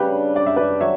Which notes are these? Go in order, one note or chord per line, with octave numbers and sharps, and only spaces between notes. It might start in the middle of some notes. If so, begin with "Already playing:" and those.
Already playing: C#3 G3 D4 G4 B4
D5
E5
B4 D5
F#3 C#5 E5